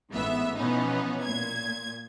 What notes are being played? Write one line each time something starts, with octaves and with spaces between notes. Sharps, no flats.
A1 G#2 E3 B3 E5
B2 E3 F3 B3 C#4 D#4
A#2 G#6